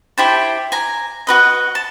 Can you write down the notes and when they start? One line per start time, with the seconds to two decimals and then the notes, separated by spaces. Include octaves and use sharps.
0.18 E4 G4 C5 G5 A5
0.72 G#5 A#5
1.27 F#4 B4 D#5
1.75 A5